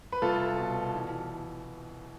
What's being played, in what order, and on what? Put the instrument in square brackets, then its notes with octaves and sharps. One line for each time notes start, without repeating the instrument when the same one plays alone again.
[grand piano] B4
C2 F4 A4
B2
E3